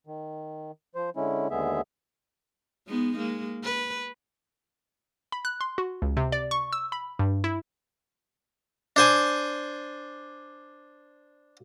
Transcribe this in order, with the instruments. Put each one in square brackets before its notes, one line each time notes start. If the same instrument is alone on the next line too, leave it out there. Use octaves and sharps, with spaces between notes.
[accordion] D#3
F3 C5
D3 G#3 C#4 E4
D#2 D3 G#3 B3 G#4 E5
[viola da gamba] G#3 B3 D#4
G#3 A#3
B4
[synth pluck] B5
F#6
C6
F#4
C#2
C3
D5
C#6
E6
B5
G2
E4
[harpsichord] D4 C5 G#5